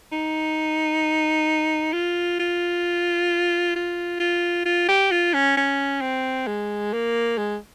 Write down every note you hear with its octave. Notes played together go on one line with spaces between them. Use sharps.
D#4
F4
F4
F4
F4
F4
G4
F4
C#4
C#4
C4
G#3
A#3
G#3